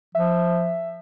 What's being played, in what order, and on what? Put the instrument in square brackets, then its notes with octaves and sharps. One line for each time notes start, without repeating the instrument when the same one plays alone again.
[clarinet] F3 [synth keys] E5